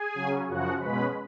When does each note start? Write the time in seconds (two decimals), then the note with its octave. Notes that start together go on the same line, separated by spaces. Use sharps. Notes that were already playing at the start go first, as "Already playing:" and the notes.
Already playing: G#4 G#5
0.15 C#3 F#3 C#4
0.48 F#2 C#3 F3 F#4 F#5
0.80 B2 G#3 C#4 B4 B5